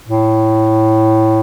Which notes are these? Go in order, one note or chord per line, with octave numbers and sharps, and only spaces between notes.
A2